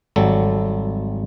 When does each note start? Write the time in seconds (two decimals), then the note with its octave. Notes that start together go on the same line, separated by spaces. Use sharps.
0.16 G#1 F#3 G3 A4